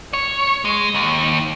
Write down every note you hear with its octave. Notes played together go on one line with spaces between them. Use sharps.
C#5
G#3
D#2